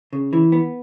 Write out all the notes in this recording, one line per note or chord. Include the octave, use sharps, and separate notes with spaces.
C#3
E3
B3